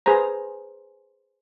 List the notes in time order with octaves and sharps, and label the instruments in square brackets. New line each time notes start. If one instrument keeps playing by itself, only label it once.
[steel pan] G#4 B4 C5 A#5